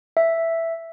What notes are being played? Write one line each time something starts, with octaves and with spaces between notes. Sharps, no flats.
E5